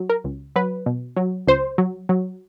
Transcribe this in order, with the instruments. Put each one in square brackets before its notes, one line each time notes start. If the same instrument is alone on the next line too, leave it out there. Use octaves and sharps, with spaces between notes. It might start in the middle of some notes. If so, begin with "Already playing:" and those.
Already playing: [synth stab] F#3
A#4
C#2
F#3 B4
B2
F#3
C#2 C5
F#3
F#3